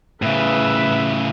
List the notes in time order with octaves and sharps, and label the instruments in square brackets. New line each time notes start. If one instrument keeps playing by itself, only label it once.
[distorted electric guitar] A2 C#3 [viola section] B4 E5